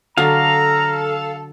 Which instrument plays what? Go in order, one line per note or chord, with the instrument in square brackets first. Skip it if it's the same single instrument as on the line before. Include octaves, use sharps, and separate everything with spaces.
[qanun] D3 F#3 [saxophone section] A4 [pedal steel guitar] F5 [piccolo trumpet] A#5